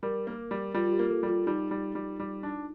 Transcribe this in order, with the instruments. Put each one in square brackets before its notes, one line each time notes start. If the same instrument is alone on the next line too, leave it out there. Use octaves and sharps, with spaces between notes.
[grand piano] G3 [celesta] A#4
[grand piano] A#3
G3
[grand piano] G3 [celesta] F4
[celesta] F4
G4
[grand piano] A#3
[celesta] A4
[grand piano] G3
[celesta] F4
[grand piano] G3 [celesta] D#4
[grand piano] G3
G3
G3
D4